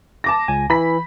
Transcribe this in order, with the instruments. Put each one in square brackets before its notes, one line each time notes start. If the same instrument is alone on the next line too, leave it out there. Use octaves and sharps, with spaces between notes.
[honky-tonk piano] A5 D6 A#6
[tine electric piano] C#2 G#5
[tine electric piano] E3 [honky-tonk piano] B5 B6